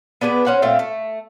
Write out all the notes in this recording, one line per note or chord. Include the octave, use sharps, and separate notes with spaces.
B3 D4 G#4 B4
C#4 C5 F#5
A#2 A3 C4 F4
A3